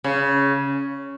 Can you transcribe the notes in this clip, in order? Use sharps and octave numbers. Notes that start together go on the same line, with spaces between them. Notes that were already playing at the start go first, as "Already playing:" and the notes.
C#3